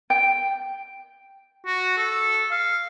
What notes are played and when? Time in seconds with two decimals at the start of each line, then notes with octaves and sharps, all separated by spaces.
0.10 G5
1.66 F#4
1.98 A4
2.51 F5